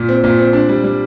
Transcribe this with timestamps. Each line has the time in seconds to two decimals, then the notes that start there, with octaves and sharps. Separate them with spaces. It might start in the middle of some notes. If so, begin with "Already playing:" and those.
Already playing: A#2
0.09 C4
0.24 A#2
0.39 C4
0.53 D4
0.69 G3
0.84 G3